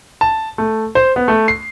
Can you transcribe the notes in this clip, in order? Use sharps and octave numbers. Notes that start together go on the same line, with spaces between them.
A5
A3
C5
B3
A3
C7